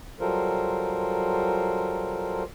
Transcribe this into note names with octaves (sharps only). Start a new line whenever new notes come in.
F#3 G3 F4 A4 A#4 C5